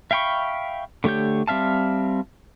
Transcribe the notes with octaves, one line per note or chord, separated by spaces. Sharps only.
E5 F5 G5 B5 C#6
D3 A3 G4 C#5 G6
G3 C4 E5 F5 A5